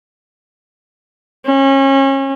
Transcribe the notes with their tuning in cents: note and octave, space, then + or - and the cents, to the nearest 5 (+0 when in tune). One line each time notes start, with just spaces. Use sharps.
C#4 -30